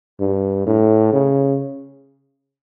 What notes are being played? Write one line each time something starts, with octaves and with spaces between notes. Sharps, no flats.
G2
A2
C#3